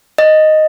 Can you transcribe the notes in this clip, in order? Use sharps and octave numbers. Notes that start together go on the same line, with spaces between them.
D#5